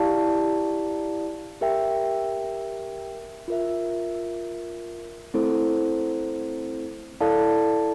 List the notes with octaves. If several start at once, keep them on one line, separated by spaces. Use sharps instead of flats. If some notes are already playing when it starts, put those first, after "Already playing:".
Already playing: E4 G4 D5 F5 A5
G4 A#4 E5 G5
F4 A#4 E5
A3 C4 E4 A4 C5
E4 A4 D5 F5 A5